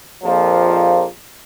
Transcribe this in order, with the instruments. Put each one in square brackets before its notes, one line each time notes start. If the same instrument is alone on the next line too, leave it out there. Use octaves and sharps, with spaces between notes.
[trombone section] A#1 F2 F3 A#3